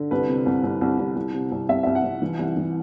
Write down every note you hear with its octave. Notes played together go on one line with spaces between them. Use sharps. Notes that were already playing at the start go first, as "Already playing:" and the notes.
Already playing: D3
C2 B4
C3
C2
C2
C2
C2
C2
C3
C2
C2 E5
C2 E5
F#5
C2
E3
C2
E3